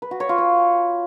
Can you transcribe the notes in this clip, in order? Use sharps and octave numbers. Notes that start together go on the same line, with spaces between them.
B4
F#4
C#5
F4
C#5